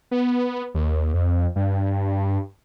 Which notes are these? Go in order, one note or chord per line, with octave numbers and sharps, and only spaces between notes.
B3
D#2
F2
G2